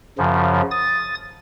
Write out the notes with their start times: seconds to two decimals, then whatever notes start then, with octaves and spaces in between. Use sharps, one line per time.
0.18 F#2 C#3 F3
0.71 D#6 A6